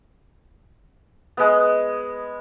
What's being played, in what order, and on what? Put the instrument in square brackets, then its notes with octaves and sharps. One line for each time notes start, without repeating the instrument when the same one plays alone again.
[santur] G#3 B3